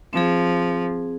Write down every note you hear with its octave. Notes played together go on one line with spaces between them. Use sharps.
F3 C4 G#4